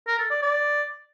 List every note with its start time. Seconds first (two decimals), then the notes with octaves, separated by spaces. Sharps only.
0.07 A#4
0.19 A4
0.31 D5
0.42 D5